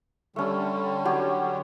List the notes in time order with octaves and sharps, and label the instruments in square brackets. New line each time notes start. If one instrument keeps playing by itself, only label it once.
[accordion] D3 G3 [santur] A3 C#4
[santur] F#3 G4 C#5